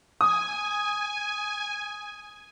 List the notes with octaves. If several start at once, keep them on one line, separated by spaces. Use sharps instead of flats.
G#5 D#6